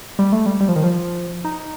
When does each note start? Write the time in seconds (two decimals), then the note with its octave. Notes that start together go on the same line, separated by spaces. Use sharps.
0.19 G3
0.32 A3
0.46 G3
0.60 G3
0.68 F3
0.76 D#3
0.84 F3
1.44 D#4